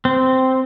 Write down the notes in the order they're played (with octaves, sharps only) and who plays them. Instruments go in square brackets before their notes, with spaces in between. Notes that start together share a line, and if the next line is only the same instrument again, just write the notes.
[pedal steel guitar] C4